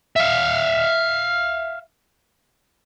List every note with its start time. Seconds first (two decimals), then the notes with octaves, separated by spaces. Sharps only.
0.16 E5 F5